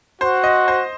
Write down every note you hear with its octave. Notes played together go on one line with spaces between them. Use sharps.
F#4 C5
D#5
C5